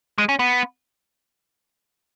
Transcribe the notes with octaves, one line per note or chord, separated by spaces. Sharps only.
G#3
C#4
B3